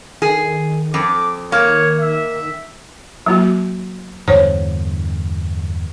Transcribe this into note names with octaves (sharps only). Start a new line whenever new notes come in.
D#3 G#4
F2 D6
D#3 A#3 C#5
E5
F#3 A#3 F#4
E2 G2 D3 C5 C#5